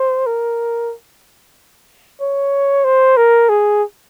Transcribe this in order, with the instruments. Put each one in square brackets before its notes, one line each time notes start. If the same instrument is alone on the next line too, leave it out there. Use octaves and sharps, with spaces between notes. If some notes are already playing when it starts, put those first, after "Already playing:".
Already playing: [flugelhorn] C5
A#4
C#5
C5
A#4
G#4